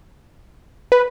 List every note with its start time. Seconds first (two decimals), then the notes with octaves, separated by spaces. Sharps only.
0.92 B4